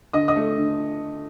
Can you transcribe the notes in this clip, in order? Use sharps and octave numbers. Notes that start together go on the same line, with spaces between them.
D3 D#5 D#6
D#5 D#6
A3
D3